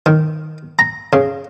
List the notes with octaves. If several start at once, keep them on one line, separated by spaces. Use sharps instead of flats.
D#3
A#5
C#3